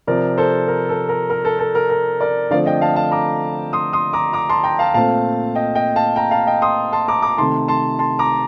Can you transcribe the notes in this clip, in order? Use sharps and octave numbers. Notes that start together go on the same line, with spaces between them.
C3 F3 C4 A#4 D5
A4 C5
A#4
A4
A#4
A#4
A4
A4
A#4
A#4
A#4 D5
D3 F3 A3 C4 D5 F5
D#5 G5
F5 A5
F5 A5
A#5 D6
C6 D#6
C6 D#6
A#5 D6
A#5 D6
A5 C6
G5 A#5
F5 A5
A#2 A3 C4 F5 A5
D#5 G5
D#5 G5
F5 A5
G5 A#5
F5 A5
D#5 G5
C6 D#6
A5 C6
A#5 D6
A#5 D6
C3 D#3 A3 A5 C6
A5 C6
A5 C6
A#5 D6